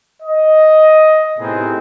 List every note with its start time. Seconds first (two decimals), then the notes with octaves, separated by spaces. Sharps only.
0.22 D#5
1.39 A2 C3 B3 C4 D#4 G#4